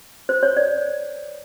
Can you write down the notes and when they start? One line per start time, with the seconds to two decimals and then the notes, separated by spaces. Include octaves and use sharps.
0.29 C5
0.43 C#5
0.57 D5